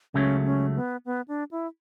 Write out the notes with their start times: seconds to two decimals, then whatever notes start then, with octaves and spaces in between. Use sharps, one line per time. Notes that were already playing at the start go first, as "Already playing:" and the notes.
0.14 C#2 C#3 F#3 A3 C#4
0.45 C#4
0.76 B3
1.05 B3
1.28 D4
1.51 E4